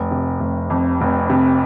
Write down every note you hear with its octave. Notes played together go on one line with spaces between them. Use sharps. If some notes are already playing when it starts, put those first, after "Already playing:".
Already playing: F1
C3
F1
F2
F1
C3